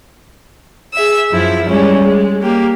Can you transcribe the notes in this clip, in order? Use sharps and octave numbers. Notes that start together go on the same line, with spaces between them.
G#4 E5 E6
F#2 F3 E4
G3 G#3 C#4
G#3
A#3 G4